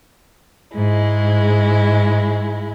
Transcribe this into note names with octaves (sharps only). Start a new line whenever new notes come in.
G#2 G#3 E4